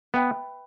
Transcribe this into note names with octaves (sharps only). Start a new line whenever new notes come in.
B3 B4 E5 G5 B5